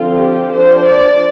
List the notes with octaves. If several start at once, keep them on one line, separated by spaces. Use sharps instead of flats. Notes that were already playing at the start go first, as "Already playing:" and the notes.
Already playing: D3 F3 C4 F4
G4
F3 D4 C5
D5